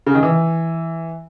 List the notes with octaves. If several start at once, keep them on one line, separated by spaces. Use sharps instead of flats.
C#3
D#3
E3